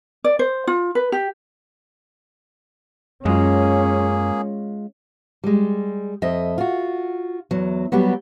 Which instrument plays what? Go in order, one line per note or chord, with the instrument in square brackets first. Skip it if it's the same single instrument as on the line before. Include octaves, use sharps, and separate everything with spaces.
[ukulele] D5
C5
F4
B4
G4
[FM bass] F#2 [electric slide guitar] G#3 F4 [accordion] A#3 G#4 [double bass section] C#4
[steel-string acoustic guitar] G3 G#3
F2 D#5 E5
F4 F#4
E2 F#3
F#3 G3 B3 F#4 G4